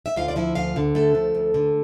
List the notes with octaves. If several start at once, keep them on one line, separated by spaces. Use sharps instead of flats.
E5
D2 F4 F5
D5
F3 E4 E5
D2 F4 F5
D3
D2 A3 A4
F3
D2
D3